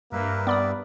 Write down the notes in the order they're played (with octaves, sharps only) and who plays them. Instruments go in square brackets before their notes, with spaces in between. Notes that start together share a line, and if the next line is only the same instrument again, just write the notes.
[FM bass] G2 [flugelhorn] A#3 [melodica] A#4 B4 E5
[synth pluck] B3 B5 D#6 [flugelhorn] D5